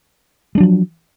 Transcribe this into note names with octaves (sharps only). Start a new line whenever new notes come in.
F3 F#3 G#3 D4